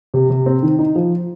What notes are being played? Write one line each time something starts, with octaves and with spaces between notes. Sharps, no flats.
C3
C3
C4
D#3
D#4
F3